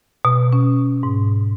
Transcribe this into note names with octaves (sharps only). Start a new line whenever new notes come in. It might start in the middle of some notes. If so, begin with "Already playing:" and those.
B2
C#4
G#2